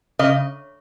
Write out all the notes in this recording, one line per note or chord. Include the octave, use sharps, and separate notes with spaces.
C#3 D#5